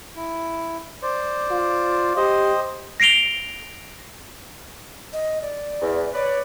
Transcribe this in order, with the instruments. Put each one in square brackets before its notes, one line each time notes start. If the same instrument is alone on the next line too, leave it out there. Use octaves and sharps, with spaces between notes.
[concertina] E4
C5 D5
[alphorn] F4
[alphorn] G4 [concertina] C5 D#5
[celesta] A#6 C7 D7 F7 G7
[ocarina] D#5
D5
[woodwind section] E2
[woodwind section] B4 D5 [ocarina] C#5